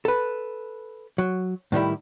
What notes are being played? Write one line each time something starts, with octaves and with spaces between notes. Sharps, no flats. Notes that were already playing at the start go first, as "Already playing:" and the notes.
A4 B4
F#3
A2 D#3 G3 E4